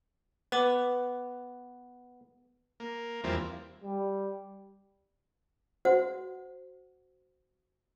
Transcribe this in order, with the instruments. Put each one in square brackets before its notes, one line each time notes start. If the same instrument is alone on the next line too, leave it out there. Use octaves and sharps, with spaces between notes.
[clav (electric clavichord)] B3 [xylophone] B4 D6
[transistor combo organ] A#3
E2 E3 F3 G3 A#3 C4
[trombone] G3
[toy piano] F#4 C5 F#5